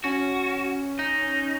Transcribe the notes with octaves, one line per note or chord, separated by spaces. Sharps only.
C#4 F#4
D#4